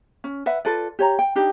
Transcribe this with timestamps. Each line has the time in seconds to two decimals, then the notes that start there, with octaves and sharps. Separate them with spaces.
0.24 C#4
0.46 B4 E5 F#5
0.65 F4 A4 B4 D5
0.99 G4 C#5 A#5
1.19 G5
1.35 D4 D#4 G4